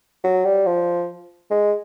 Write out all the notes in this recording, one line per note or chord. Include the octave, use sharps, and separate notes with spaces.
F#3
G3
F3
G#3